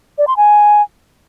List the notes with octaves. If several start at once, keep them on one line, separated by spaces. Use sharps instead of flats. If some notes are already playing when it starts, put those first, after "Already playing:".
D5
C6
G#5